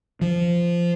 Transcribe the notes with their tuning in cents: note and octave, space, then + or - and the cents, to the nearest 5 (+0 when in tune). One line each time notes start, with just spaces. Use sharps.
F3 -10